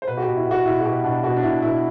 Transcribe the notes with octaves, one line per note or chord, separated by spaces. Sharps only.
C5
B2 B4
F#4
B2 G4
E4
B2 F#4
B2 E4
F#4
B2 G4
B2 D4
B2 F#4
D4
B2 E4
B2 E4